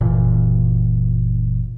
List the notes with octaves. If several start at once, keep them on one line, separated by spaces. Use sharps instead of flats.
F#1 A#2 E3